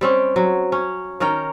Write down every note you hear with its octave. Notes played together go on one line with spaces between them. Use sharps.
G3 C4 C#4
F#3
C#4
D#3 C#4 A#4 G5